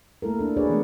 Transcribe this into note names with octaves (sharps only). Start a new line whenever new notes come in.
A3 A#3 E4 A4 A#4
D4 A4
D4 F#4 G#4 B4 C#5 D5
E3 G#3 A3 B3